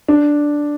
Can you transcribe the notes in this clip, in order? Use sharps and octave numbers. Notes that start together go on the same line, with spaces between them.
D4